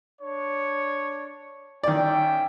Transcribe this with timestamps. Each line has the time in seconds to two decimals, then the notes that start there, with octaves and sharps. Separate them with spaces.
0.20 D4 C#5
1.83 D#3 C#4 D5 E5 G5